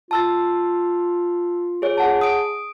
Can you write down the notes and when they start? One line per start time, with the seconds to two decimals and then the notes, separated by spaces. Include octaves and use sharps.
0.11 F4 A5 E6 A6
1.82 G#4 C#5
1.97 G#4 F#5 A5
2.21 D#6 D7